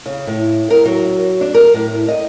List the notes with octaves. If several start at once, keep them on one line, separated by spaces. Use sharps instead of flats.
C#3
A2
A#4
F#3
D4
A#4
A2
D#5